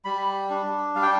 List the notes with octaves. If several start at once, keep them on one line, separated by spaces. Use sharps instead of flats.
G3 B5
D4
G3 F5
G5